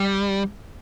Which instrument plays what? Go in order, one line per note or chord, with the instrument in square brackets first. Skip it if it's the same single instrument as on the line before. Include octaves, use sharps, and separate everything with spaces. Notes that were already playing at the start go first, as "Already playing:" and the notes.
Already playing: [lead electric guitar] G3